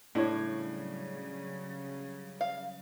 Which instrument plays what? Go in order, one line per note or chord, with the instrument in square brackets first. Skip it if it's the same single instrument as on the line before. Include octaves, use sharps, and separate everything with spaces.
[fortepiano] A2 [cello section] C#3 F#3 G3 [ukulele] D4 C#5
[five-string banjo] F5